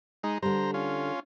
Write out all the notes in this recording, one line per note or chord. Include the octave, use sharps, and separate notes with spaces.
G#3 D#4
D3 G3 C5 A#5
C#4 F4